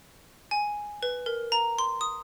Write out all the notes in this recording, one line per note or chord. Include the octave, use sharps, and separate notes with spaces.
G#5
B4
A#4
A#5
C6
D#6